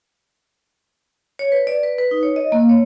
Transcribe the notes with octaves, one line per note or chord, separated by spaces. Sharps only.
C#5
B4
D5
B4
B4
D#4
C#5
D#5
A#3
C#5